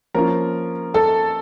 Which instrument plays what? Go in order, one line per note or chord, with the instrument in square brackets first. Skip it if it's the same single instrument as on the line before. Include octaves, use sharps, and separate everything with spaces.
[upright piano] F3 A#3 C#4 F4 A#4 A#5
A4 A5